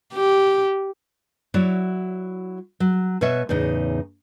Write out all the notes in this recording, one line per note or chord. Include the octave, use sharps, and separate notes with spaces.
G4
F#3 E4 F#4 C#5 D5
F#3
B2 B4 C#5 E5
E2 A2 C#3 D#4